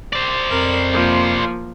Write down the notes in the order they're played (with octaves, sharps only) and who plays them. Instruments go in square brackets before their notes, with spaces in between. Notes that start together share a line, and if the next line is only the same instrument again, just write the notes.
[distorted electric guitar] C5 D5
[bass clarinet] F2 [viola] A#4 B5
[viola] F3 A#3